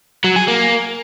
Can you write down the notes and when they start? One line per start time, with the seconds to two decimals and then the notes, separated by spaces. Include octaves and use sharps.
0.24 F#3
0.36 G#4
0.48 A#3